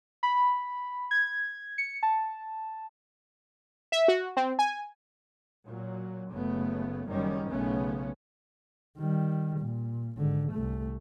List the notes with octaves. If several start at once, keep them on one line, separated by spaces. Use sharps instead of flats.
B5
G#6
C#7
A5
E5
F#4
C4
G#5
A#2 F#3
F#1 C#3 A3 B3
F#1 F#2 D#3 G3 C#4
B1 C#3 A3 B3 C#4
D#3 G3
A#2
G#1 D3
C2 A3